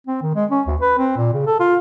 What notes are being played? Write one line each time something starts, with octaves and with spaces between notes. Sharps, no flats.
C4
D#3
G#3
C#4
D2
B4
C4
A#2
C#3
A4
F4